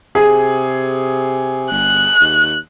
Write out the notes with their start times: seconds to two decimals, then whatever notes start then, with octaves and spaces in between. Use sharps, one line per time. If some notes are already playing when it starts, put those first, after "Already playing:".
0.15 C3 G#4
1.71 G1 F#6
2.21 D#2